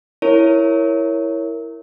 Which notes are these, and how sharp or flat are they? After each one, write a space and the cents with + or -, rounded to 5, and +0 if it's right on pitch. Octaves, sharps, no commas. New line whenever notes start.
E4 +0 A#4 -5 C#5 +0